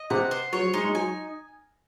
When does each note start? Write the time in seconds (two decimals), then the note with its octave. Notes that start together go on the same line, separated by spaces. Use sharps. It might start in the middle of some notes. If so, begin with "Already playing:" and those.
Already playing: D#5
0.10 C3 F#5
0.31 C5
0.53 F#3 C#5
0.63 F#3
0.74 G#3 D#4
0.84 G#3
0.95 F#3 G#5